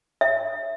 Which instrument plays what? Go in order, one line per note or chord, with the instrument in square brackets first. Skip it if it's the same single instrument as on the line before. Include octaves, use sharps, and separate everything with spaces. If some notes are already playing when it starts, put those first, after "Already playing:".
[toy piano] E5